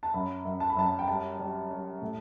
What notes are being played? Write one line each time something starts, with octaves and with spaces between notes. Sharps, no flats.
A5
F#2 B5
F#2
A5
B5
F#2 A5
G5
G3 A5
G3
G3
A2